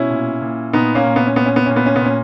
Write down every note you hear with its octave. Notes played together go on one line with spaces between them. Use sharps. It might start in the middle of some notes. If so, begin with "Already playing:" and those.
Already playing: B2 C#4 E4
A#2
A#2
A#2 B3 D#4
A#3 C#4
A#2
B3
C#4
A#2 B3
C#4
B3
A#2 C#4
B3
C#4
B3
A#2 C#4